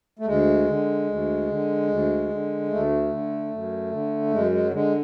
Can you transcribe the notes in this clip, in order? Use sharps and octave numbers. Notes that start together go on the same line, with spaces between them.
A3
D2 G#3
D3
D2
D3
D2
D3
D2 A3
D3
F#2
D3
F#2 G#3
G#3
F#3
D3 G#3